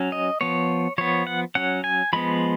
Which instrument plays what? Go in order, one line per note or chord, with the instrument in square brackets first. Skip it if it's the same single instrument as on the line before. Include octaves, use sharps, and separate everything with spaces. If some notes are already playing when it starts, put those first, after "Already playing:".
Already playing: [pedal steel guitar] F#3 C#4
D#5
F3 B3 C#5
F3 B3 C#5
F#5
F#3 C#4 F#5
G#5
F3 G#3 B3 B5